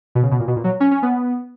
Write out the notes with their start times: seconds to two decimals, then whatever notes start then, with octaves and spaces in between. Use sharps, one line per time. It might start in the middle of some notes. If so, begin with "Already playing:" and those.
0.15 B2
0.23 C#3
0.31 B2
0.40 A#2
0.48 B2
0.56 A#2
0.64 F#3
0.80 C#4
0.91 C#4
1.02 B3